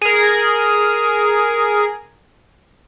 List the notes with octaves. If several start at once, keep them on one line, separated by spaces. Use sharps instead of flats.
G#4 A#4